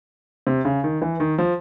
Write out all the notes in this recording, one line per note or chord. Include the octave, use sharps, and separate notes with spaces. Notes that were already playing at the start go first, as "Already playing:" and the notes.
C3
C#3
D#3
E3
D#3
F3